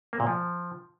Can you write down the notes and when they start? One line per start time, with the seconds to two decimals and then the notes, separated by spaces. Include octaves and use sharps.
0.13 A#3
0.20 A#2
0.27 F3